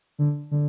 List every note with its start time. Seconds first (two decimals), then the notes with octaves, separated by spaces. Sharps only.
0.19 D3
0.51 D3